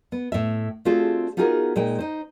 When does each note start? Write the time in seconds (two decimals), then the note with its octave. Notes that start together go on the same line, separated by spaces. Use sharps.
0.12 B3
0.32 A2 E5
0.85 A3 C4 D4 F4 F#4 G#4
1.37 B3 D#4 F4 F#4 G#4 A#4
1.76 A#2 G#3 D#4 G5
1.99 D#4 C5